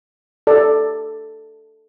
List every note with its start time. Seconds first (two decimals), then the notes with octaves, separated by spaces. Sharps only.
0.47 A4 D5